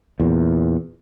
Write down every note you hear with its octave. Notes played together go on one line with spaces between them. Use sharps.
E2 A#2